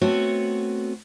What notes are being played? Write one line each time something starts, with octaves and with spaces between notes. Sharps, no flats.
A3 B3 C4 F#4 C#5